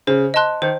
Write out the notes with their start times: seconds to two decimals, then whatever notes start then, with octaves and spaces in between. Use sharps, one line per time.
0.07 C#3 C5
0.34 D#5 A5 C6 F#6
0.62 D#3 C5